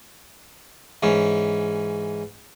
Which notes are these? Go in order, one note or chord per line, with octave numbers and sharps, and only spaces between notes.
G#2 E3 C#4